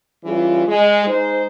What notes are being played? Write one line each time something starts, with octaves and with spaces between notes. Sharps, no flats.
E3 G3 C#4 F4 G#4
G#3
G#3 D#4 C5